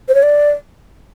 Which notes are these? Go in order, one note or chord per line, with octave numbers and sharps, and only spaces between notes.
C5
C#5
D5